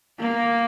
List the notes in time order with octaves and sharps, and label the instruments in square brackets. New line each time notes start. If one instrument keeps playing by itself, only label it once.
[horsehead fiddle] A#3